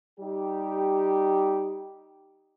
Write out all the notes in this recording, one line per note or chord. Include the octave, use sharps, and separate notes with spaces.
G3 D#4 G4